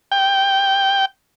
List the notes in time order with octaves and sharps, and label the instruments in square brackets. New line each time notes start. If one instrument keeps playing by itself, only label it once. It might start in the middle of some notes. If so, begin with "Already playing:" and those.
[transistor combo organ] G5